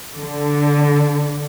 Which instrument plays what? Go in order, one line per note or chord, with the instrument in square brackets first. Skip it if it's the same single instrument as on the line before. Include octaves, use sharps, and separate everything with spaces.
[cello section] D3